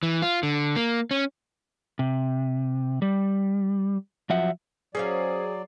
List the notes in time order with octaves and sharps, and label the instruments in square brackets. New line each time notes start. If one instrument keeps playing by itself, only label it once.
[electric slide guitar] E3
F4
D3
A#3
C#4
C3
G3
F3 F#3 E5 F#5
[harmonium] F#3 D5 [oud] C#4 C5 F5 [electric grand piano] G#4 C7